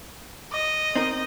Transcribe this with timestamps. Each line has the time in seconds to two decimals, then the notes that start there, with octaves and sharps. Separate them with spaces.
0.53 D#5
0.95 C4 D#4 A#4